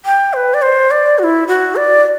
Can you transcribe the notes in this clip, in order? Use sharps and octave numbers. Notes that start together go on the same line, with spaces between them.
G5
C5
B4
D5
C5
D5
F#4
E4
F#4
D5